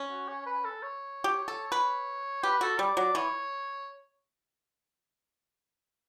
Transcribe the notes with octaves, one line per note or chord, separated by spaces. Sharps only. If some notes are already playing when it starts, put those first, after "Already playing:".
Already playing: C#4
F#4
C#5
B4
A4
C#5
G4
A4
B4
G4 B4
F#4 A4
G3 D5
F#3 D5
E3 C#5